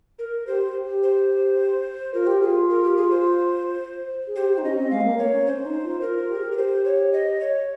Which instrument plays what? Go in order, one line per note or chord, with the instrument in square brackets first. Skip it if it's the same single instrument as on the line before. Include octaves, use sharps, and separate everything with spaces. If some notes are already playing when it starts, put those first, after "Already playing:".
[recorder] A#4
[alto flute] G4 [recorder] C5
[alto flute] G4
[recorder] C5
[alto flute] F4 [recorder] A#4
[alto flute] G4
[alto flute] F4 [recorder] G#4
[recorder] A#4
G4
G#4
C5
[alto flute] G#4
[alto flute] G4 [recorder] C5
[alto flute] G4
D#4
[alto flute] C#4 [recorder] D#5
[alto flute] C4
[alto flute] G#3 [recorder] F5
[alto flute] C4
A#3
[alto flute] A#3 [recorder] C#5
[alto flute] C#4
[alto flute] C#4 [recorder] C5
[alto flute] C#4
D#4
F4
[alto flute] F4 [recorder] A#4
[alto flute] F4
G4
G#4
G4
[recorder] A#4
C5
C#5
D#5
C#5